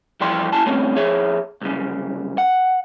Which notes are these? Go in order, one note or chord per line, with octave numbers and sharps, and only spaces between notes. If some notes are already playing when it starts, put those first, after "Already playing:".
G2 E3 F3 D5 G5 C6
A#2 E4 G#5 A5
G2 D3 A3 C4 C#4
F2 G#4 C#5 E5
C2 F#2 C#3
F#5